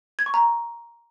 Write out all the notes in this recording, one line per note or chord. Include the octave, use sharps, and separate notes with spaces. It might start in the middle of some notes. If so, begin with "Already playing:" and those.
G#6
C#6
A#5